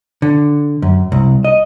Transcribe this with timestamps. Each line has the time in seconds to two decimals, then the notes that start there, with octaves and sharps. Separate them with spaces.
0.22 D3
0.82 F#2
1.12 C2
1.45 D#5